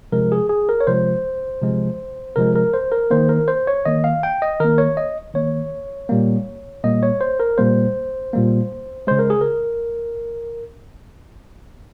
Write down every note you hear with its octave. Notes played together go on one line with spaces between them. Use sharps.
C3 F3 G#3 A#4
G#4
G#4
A#4
C#5
C3 F3 G#3 C5
C3 F3 G#3
C3 F3 G#3 A#4
A#4
C5
A#4
D#3 A#3 C5
A#4
C5
C#5
D#3 A#3 D#5
F5
G5
D#5
D#3 A#3 A#4
C#5
D#5
D#3 A#3 C#5
A#2 G3 A#3
A#2 G3 A#3 D#5
C#5
C5
A#4
A#2 G3 A#3 C5
A#2 G3 A#3
C#3 G#3 C5
A#4
G#4
A#4